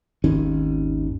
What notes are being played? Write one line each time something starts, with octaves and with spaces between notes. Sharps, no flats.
G#1 D#2 D#3 C#4